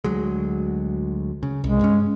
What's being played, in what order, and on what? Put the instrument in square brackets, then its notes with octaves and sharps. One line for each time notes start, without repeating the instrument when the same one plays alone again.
[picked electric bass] D2 F#3 G#3
C#3
[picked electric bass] C2 [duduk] G#3
[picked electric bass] G2 C#4